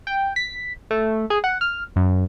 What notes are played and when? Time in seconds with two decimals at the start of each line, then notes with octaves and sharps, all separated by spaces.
0.07 G5
0.36 B6
0.91 A3
1.30 G#4
1.44 F#5
1.61 F6
1.96 F#2